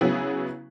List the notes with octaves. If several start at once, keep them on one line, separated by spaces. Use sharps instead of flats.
C#3 F#3 B3 E4 G#4